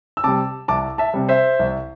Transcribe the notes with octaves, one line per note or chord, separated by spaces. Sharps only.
E6
C3 G3 A5 D6
C2 A5 D6
E5 A5
C3 G3
C5 E5
C2